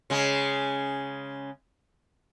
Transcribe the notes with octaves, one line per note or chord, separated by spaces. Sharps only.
C#3 G#3